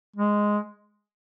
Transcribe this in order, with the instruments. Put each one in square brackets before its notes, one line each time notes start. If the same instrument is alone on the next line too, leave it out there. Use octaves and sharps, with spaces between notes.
[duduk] G#3